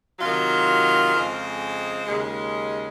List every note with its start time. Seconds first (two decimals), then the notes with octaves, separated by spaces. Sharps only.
0.19 C3 D#3 F#3 F4
1.14 F2 C#3 G#3 C4
2.06 D#2 C#3 G#3